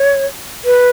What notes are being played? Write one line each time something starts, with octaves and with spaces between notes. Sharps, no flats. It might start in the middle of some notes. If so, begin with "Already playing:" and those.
Already playing: C#5
B4